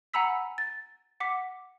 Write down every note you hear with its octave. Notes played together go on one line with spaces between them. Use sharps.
F#5 G#5 A#5 B5 E6 B6
A6
F#5 D6 B6